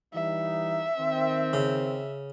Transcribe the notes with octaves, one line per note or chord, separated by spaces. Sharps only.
E3 G3 D#4 E5
D#3 C4
C#3